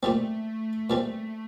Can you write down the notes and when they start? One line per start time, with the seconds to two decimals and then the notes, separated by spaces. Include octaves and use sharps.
0.03 A#2 G3 A3 C4
0.90 A#2 G3 C4